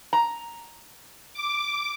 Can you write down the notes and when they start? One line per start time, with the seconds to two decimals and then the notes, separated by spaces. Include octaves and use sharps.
0.13 A#5
1.34 D6